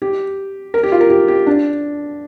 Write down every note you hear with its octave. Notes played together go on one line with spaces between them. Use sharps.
G4
A#4
G4
F4
A#4
G4
G4
D4